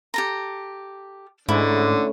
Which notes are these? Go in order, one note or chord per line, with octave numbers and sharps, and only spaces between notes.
G4 A4 A#5
G#2 D3 A3 C#4 E4